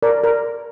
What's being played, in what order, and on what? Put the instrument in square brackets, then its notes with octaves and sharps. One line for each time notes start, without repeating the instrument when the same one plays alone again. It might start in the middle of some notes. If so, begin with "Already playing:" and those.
[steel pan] A#4 D5
A#4